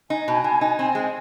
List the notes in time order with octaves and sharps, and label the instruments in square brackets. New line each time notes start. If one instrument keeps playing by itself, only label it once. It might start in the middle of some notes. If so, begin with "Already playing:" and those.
[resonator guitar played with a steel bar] D#4 [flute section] G#5
[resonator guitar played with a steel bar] B2
B2
D#4
C4
G#3